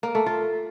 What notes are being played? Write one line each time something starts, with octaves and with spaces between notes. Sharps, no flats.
A#3
A3
F4